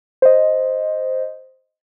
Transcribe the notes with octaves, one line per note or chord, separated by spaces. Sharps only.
C5 D#5